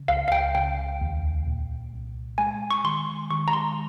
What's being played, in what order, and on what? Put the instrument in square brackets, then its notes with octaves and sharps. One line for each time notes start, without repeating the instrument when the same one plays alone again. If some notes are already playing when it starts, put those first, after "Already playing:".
Already playing: [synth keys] C#3
[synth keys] C#2 [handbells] F5
[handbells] F5
G5
[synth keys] C#3 [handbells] G5
[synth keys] D#2
A#2
C2
[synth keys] G#3 [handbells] G#5
[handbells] C#6
[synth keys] D#3 [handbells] C6
[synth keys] D#3 [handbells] C#6
[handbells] A#5
C6